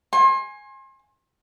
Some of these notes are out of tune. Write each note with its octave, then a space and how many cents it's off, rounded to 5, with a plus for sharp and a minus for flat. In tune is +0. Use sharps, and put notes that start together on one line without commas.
G#5 -5 C6 +35